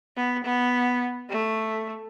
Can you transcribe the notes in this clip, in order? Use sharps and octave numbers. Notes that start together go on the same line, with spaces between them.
B3
B3
A3